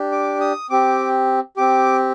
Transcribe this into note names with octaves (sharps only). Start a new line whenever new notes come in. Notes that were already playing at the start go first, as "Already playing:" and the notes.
Already playing: D4 G4
D6
D#6
C4 G4 D6
C4 G4 D6